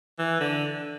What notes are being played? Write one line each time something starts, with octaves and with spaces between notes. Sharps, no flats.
E3
D3